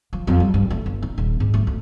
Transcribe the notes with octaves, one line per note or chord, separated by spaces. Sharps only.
F3
F2
G3
G2
A3
G1
D#4
D#1
G#2
A3
D2